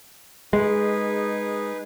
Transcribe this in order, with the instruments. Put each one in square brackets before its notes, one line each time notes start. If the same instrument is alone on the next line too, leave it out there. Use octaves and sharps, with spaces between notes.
[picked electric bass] G#3 [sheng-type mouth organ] D#4 G#4 B4